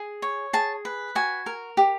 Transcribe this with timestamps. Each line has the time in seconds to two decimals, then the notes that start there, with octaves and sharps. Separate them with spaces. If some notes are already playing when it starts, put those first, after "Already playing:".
Already playing: G#4
0.22 C#5
0.53 G#4 A5
0.85 B4
1.15 F#4 G#5
1.46 A#4
1.77 G4